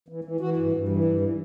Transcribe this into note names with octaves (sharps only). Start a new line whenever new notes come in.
E3
E3
E3 F#4
G2
G2
E3
G2
E3